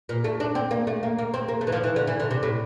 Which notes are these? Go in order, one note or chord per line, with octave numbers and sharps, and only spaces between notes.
A#2
A3
D4
C4
A#3
A3
A#3
A#3
C4
A#3
A3
E3
F3
E3
D3
E3
D3
C3
A2